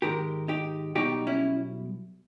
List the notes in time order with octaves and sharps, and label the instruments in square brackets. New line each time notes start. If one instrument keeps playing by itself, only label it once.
[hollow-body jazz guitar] G#2 D#3 G#3 G4 A#4
D#4 G4
B1 B2 G3 D#4 G4
C#4 E4